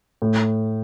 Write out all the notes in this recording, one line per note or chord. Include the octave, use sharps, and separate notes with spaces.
A2